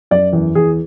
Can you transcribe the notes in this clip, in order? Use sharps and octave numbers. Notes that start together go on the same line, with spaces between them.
F#2 D5
E2
E2 G#4